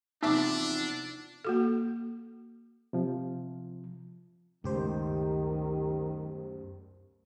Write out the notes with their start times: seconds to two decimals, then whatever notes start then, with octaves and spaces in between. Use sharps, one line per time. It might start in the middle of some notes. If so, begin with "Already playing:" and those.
0.23 E2 C3 F3 D4 D#4 E5 D6 E6
1.45 A#3 F#4 A4
2.93 C3 F3
4.64 C#2 F#2 D#3 A3 G4 C5